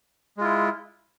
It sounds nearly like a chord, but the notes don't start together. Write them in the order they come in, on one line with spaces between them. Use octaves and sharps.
G#3 F4 E4